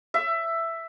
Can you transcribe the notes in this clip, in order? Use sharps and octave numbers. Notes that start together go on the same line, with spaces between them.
E5